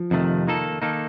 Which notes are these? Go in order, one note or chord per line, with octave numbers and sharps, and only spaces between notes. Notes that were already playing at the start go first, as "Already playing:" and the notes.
Already playing: F3
F2 C3 D#3 A3
D#3 A#3 D#4 A4
D#3 A#3 D#4 A4